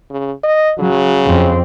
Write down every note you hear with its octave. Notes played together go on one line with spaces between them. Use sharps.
C#3
D#5
C#3 F#3
F2 C4